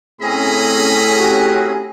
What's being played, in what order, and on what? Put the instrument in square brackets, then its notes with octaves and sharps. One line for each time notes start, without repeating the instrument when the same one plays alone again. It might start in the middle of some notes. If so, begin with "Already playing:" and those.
[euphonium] A2 [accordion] C4 C#4 G#4 [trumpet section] D#5 A#5 B5
[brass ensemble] F#4 G4